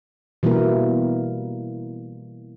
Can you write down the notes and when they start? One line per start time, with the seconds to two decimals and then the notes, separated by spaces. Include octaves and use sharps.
0.43 B2 E3 G3 A#3 E4 A#4